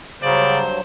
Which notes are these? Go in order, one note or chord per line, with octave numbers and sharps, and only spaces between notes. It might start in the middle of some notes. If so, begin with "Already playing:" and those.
G2 C#3 F#3 C5 D5